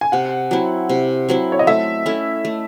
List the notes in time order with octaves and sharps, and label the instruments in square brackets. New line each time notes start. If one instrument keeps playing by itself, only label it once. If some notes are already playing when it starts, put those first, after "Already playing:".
[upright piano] G#5
[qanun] C3 [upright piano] F#5
[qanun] F#3 C4 E4
C3
F#3 C4 E4
[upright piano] C#5
D#5
[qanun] A3 [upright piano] E5
[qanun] C#4 E4 A4
A3